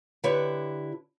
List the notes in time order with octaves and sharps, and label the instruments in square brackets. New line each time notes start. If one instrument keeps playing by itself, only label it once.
[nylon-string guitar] D3 E4 G4 B4 C#5